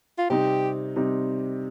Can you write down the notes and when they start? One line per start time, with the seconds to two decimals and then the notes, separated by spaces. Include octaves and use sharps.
0.18 F4
0.30 C3 G3 C4 D#4 G4
0.96 C3 G3 C4 D#4